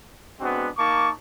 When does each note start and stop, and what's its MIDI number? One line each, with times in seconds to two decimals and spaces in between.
0.41 0.68 56
0.41 0.68 59
0.41 0.68 60
0.41 0.68 62
0.41 0.68 66
0.77 1.10 58
0.77 1.10 63
0.77 1.10 81
0.77 1.10 85
0.77 1.10 86